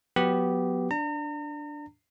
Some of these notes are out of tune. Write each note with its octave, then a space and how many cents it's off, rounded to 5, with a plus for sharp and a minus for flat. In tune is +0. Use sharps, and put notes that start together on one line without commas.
F#3 -25 B3 +0 G4 -10
D4 +0 A#5 -40